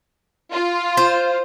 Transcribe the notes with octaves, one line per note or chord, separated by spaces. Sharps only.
F4
C5